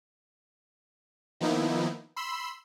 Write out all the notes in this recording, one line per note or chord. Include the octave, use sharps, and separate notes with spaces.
D#3 F3 A#3 B3 D#4 E4
B5 C6 E6